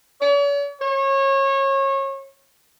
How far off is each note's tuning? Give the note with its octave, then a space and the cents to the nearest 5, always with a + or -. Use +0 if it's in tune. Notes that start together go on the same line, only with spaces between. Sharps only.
C#5 +45
C#5 -30